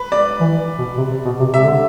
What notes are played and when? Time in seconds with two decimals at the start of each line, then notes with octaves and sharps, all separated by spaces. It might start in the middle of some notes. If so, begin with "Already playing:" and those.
Already playing: B4
0.12 D5
0.41 E3
0.78 B2
0.97 C3
1.11 C3
1.25 B2
1.39 C3
1.53 C3 E5
1.65 D3